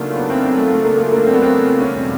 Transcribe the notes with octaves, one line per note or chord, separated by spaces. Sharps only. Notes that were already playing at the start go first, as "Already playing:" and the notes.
Already playing: C#3 F#3 A3 A#3 D4 D#4 F4
B3
C4
C4
A3
A3
A#3
A3
A#3
C4
B3
C4
E2 B2 G3 C#4
C4